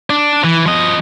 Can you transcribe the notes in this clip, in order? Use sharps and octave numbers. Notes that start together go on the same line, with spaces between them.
D4
E3
F3 D#5